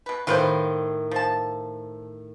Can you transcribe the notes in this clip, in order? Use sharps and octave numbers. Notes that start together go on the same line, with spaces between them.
B2 B4
A2 D#3 F4 B4 C5
F3 A5